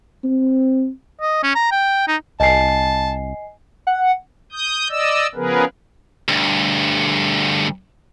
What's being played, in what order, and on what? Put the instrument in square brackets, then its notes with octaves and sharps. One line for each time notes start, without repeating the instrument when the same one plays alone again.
[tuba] C4
[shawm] D#5
C#4
A#5
G5
D#4
[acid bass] C2 [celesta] D#5 G#5 C7 [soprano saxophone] A5
[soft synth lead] F#5
[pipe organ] D#6 G6
D5 D#5 E6
C#3 F3 B3 G#4 A#4 B4
[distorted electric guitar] D2 G2